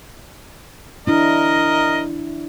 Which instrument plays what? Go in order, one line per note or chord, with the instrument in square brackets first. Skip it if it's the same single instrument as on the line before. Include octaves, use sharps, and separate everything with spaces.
[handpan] D4 E4 [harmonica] A#4 D#5